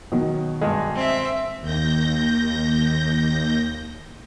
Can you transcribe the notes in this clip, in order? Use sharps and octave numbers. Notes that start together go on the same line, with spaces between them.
B2 D#3 F#3
G2 G#3
C4 E5
D#2 G6 A#6